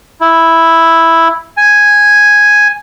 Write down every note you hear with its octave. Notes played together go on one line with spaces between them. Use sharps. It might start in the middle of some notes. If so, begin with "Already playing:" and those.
E4
G#5